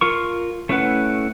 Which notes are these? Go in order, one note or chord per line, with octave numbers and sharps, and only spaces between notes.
F4 A#4 C#6
A3 C#4 E4 B4 F#5